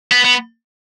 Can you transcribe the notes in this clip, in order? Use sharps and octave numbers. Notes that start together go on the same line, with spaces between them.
B3
B3